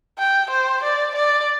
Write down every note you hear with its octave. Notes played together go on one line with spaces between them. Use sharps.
G5
C5
D5
D5